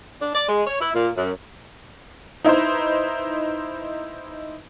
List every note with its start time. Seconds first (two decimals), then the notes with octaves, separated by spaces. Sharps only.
0.21 D4
0.34 D5
0.49 G#3
0.67 C#5
0.81 E4
0.95 A#2
1.16 F#2
2.45 D#4 E4 B4 C5